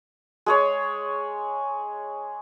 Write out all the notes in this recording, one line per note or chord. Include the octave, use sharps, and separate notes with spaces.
G#3 G#4 C#5